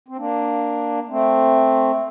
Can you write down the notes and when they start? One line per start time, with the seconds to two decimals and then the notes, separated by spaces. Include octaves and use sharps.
0.08 C4
0.17 A#3 D4
1.09 A3 C4